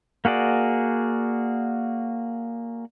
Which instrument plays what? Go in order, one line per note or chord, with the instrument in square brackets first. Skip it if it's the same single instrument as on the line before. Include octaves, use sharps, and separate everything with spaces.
[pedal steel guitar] A#3 F#4 G#4 D5